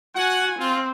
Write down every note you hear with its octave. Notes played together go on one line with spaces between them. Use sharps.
F#4 F#5 G#5
C4 F4